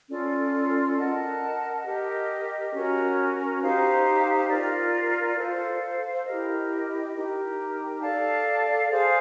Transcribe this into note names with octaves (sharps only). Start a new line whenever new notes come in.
C#4 F4 A4 D5
A#4 D#5 F#5 A5
G4 A#4 D#5
C#4 F#4 A#4
D#4 G4 C5 F5
F4 A#4 D5
A4 C5 F5
E4 G4 A#4 D#5
D#4 G4 A#4
A4 D5 F5 A5
G#4 C5 F5